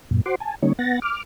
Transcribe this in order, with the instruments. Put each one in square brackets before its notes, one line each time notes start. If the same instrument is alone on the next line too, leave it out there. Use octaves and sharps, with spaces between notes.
[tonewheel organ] F#2 A#2
F#4 C5 F#5 C6 D6
G#5 A5
D3 G3 A#3 C#4 D#4 C#5
B3 F#5 A6 A#6
D6 F6